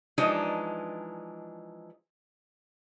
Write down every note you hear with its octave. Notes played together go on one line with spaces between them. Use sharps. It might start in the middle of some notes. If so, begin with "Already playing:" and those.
E3 F3 G#3 D4 D#4